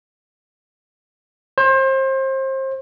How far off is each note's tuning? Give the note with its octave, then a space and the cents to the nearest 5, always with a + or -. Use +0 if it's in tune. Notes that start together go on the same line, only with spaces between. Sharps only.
C5 +30